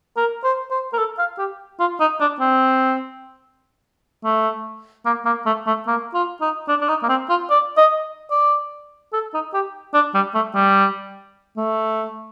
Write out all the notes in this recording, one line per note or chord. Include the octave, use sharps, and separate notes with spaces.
A#4
C5
C5
A#4
A4
F5
G4
F4
D#4
D4
C4
A3
A#3
A#3
A3
A3
A#3
F4
D#4
D4
D4
D#4
A#3
C4
F4
D5
D#5
D5
A4
D#4
G4
D4
G3
A3
G3
A3